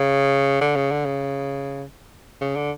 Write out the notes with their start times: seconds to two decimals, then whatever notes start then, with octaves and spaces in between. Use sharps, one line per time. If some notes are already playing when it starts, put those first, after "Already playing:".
Already playing: C#3
0.61 D3
0.76 C#3
0.91 D3
1.05 C#3
2.41 C#3
2.56 D3